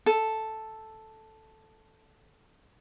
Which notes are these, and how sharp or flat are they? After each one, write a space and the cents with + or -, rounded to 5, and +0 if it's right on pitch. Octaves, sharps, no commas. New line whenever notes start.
A4 +0